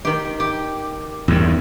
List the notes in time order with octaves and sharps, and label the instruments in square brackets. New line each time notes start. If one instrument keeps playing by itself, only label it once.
[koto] D#3 G4
G4
[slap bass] E2 G2 D#3